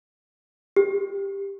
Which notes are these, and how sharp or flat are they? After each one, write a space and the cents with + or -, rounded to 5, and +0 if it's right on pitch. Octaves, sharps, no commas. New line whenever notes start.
G4 +15